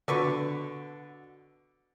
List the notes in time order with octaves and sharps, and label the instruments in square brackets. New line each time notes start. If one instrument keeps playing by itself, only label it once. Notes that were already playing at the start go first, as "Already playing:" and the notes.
[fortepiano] B2 D3 [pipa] A4 B4 C#6